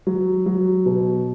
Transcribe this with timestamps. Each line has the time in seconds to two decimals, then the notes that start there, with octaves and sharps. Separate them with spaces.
0.07 F#3
0.46 F#3
0.86 B2